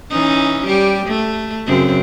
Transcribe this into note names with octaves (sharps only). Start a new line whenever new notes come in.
E3 C#4 D#4
G3 G4
A3
F#2 C#3 C4